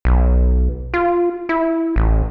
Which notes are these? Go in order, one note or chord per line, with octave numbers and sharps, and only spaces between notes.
B1
F4
E4
A1